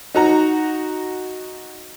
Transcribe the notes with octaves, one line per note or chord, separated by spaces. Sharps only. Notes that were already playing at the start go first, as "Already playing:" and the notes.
D#4 F#4 A#5